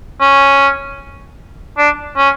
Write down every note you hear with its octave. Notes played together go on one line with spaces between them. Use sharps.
C#4
D4
C#4